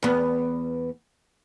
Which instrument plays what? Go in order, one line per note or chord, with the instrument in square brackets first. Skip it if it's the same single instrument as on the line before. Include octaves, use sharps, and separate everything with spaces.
[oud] E2 B3